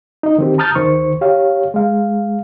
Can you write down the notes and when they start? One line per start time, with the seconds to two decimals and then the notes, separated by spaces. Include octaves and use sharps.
0.23 D#4 D#5
0.38 D#3 C4 G4
0.58 A5 A#5 D#6 F6 G6 A6
0.75 D2 D#3 C5 C#6
1.21 G4 C#5 F5
1.74 G#3 F5